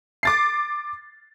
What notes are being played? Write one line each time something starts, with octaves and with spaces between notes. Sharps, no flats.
D6 A6 C7